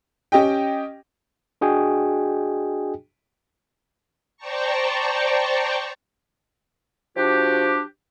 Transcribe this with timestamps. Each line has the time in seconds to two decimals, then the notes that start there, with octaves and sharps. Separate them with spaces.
0.32 C#4 G4 D#5 G5
1.61 D4 F#4 G#4 D#5 G5 G#5
4.37 C5 D5 G5 A5 A#5 C#6
7.17 F3 D4 F#4 G4